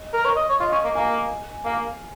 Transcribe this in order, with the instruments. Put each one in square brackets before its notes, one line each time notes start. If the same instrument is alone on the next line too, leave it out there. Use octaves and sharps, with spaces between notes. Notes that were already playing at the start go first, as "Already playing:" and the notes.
Already playing: [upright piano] D#5
[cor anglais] A#4
C#5
D#5
C#5
[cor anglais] F4 [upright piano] D#5
[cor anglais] C#4
A#3
[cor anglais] A#3 [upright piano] G#5
[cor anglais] A#3 [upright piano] F5